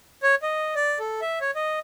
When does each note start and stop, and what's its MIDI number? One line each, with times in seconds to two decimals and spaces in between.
0.23 0.35 73
0.42 0.74 75
0.75 0.99 74
0.99 1.21 69
1.21 1.39 76
1.41 1.51 73
1.55 1.79 75